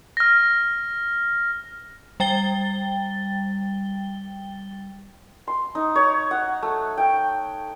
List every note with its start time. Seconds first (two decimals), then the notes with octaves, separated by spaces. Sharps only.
0.17 F6 A#6
2.20 G3 G5 A6 G7
5.47 C6
5.75 D#4
5.95 C#5
6.31 F#5
6.62 A3
6.97 G5